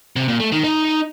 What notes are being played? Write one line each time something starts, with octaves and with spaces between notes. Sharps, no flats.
C3
A#2
A3
D#3
D#4